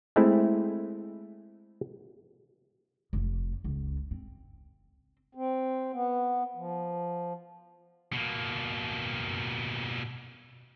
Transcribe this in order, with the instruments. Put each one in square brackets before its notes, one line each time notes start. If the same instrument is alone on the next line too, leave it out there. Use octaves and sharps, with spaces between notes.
[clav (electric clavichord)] G#3 A3 C4 E4
[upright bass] F1
C#2
C4
[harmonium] C4
B3
F3
[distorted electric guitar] B2 A#3